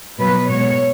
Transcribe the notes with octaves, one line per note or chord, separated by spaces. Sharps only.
B2 F#3 B4
B2 G#3 C#5